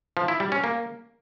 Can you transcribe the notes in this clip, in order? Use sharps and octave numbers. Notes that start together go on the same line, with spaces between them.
F3
E4
G3
C#4
A#3